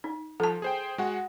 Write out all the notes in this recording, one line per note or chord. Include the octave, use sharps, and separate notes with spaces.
D#4
F3 A4 A5
G#4 C5 G5
G#3 F#4 F#5